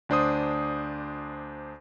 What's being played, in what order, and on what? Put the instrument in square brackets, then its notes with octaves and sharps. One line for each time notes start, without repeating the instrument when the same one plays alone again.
[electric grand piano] D2 D4 C5 D#6